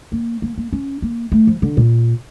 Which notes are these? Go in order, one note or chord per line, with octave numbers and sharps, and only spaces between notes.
A#3
A#3
A#3
C#4
A#3
A3
F3
D3
A#2